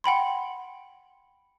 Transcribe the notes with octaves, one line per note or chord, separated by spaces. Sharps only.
F#5 G5 B5 C6